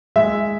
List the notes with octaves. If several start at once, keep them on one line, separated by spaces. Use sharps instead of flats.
G#3 E5